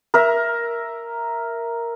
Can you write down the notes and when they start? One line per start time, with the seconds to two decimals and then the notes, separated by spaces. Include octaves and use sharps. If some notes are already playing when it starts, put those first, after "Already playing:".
0.14 A#4 E5